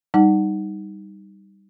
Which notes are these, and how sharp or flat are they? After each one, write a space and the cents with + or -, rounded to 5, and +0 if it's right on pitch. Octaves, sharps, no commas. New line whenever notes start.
G3 +0 D#4 +0 F#5 +5